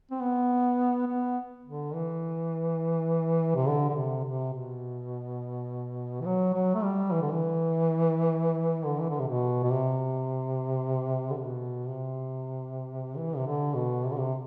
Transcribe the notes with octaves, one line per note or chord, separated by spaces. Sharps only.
C4
B3
B3
D3
E3
C3
D3
D3
C3
C3
B2
E3
F#3
F#3
A3
G3
E3
D3
E3
D3
E3
D3
C3
B2
B2
C3
D3
C3
B2
C3
E3
C3
D3
B2
C3
D3
C3